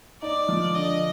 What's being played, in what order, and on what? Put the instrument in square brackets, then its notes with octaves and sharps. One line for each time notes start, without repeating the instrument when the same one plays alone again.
[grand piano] D#4 [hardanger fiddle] D5
[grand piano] F3
[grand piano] D3 [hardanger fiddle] D#5